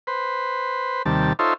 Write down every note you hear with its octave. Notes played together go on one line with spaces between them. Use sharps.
B4 C5
D#2 C3 G3 A5
D#4 F4 A4 C5 C#5 E5